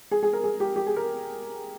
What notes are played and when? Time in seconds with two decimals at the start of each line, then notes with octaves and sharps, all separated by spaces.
0.11 G#4
0.23 G#4
0.33 A#4
0.44 G#4
0.60 G4
0.76 G4
0.86 G#4
0.96 A#4